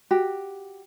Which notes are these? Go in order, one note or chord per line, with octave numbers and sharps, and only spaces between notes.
F#4 G4